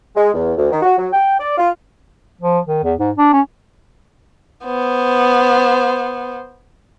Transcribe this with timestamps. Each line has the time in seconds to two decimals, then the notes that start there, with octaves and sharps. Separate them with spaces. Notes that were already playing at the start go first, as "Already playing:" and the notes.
0.16 G#3
0.34 E2
0.57 D2
0.71 D#3
0.82 F#4
0.98 F#3
1.13 G5
1.39 D5
1.58 F4
2.41 F3
2.67 D#3
2.84 E2
2.99 G#2
3.18 D4
3.33 C#4
4.65 B3 C5